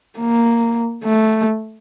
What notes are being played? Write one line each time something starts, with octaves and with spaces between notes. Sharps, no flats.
A#3
A3